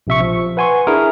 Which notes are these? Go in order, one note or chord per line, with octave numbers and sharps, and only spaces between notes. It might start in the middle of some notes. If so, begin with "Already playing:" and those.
A#1 C3 E5 C#6
F3
B4 F#5 G#5 C6 C#6
D4 E4 G#4 A#4